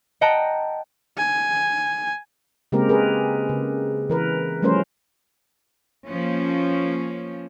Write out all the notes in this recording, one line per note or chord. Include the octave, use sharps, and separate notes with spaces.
D#5 F#5 G5 A5 A#5
G#5
C#3 G#3 A#3 C4 G4 A#4
G#4 A#4 B4
C#3
E3 A#4 B4
F3 G3 A3 C#4 A#4 C5
F3 A#3 C#4